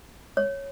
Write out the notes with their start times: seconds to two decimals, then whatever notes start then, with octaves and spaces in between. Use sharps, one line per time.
0.37 C#5